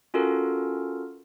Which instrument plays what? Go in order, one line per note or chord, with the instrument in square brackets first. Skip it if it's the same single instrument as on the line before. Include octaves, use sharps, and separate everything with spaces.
[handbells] C#4 F4 F#4 A4 A#4